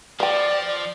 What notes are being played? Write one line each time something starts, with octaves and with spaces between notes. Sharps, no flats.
F3 B4 D5 G5